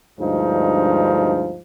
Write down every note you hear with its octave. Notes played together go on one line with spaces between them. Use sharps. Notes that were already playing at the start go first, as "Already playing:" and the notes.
D2 G2 F3 G#3 D#4